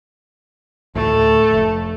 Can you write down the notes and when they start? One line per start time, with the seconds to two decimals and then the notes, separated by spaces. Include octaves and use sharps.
0.95 D2 A2 D3 A3
1.52 F1